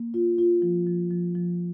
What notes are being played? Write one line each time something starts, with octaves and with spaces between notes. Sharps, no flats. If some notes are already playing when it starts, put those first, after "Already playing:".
Already playing: A#3
F4
F4
F3
F3
F3
F3